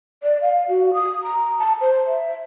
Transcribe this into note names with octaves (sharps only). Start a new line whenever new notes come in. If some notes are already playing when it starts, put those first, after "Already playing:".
D5
F5
F#4
D#6
A#5
A5
C5
E5